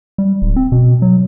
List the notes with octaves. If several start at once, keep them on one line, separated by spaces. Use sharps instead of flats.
G3
D1
C4
B2
F#3